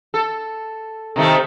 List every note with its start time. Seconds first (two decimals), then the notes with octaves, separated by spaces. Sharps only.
0.14 A4
1.16 C3 D#3 A3